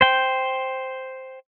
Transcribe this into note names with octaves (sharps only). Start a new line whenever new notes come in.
C5 G5